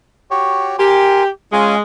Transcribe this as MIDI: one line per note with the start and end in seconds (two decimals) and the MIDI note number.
0.31 0.76 66
0.31 0.76 67
0.31 0.76 73
0.79 1.27 67
0.79 1.23 70
0.79 1.23 80
0.79 1.23 84
1.53 1.80 56
1.53 1.75 61
1.53 1.75 65
1.53 1.75 80